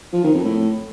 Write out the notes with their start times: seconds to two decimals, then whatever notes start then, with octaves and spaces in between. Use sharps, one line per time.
0.13 F3
0.24 D#3
0.34 F2
0.45 A2